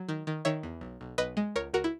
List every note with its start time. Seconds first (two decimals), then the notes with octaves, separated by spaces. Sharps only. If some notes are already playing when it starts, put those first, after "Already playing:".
Already playing: F#3
0.09 D#3
0.27 D#3
0.45 D#3 C#5 E5
0.63 E2
0.81 B1
1.01 B1
1.18 B1 B4 D#5
1.37 G#3
1.56 C#2 A#4 C#5
1.74 C#2 F#4 A#4
1.84 E4